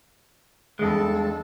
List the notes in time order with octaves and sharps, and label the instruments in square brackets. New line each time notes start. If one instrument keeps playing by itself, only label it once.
[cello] E2 A4 [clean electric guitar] G2 G#3